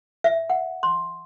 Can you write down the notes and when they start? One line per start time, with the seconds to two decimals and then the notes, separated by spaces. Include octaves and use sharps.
0.24 E5
0.50 F#5
0.83 C6